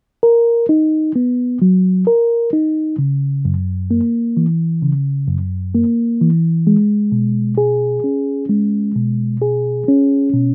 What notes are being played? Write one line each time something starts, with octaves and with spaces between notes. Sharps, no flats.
A#4
D#4
B3
F#3
A#4
D#4
C#3
F#2
A#3
E3
C#3
F#2
A#3
E3
G#3
B2
G#4
C#4
G#3
B2
G#4
C#4
B2